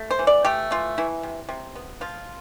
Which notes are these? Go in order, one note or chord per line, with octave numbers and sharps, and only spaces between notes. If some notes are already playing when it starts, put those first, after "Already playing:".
Already playing: A3
C5
E3
D5
A3 G4
E3 F4
E3 E4
C3
C3
B3
F3 F4